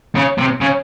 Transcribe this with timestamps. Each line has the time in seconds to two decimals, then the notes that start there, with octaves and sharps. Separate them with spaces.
0.16 C#3
0.38 C3
0.61 C#3